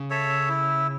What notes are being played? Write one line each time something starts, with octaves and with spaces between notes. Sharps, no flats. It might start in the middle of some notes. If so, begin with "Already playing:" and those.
Already playing: C#3
A4 C#5 E5
E4